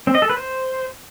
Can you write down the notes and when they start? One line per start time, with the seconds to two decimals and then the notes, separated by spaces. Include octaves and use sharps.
0.07 C4
0.15 D#5
0.22 A4
0.30 B4
0.37 C5